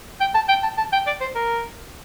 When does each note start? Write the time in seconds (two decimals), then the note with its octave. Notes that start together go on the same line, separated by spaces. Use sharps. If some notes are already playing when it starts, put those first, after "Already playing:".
0.20 G5
0.35 A5
0.49 G5
0.63 A5
0.78 A5
0.93 G5
1.07 D5
1.21 C5
1.35 A#4